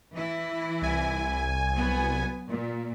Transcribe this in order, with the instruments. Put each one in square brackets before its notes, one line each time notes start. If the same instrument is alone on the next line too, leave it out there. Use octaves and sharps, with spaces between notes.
[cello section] E3 E4
[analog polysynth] C2 G#5
[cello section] F#3 B3
A#2